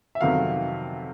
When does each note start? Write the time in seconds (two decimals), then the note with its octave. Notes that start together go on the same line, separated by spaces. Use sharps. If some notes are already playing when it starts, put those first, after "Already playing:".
0.15 E5
0.21 F2 C3 D#3 F#3 B3 F5